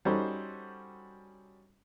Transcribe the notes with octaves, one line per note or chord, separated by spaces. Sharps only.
G3 C#4 D#4 F#4 A4 C5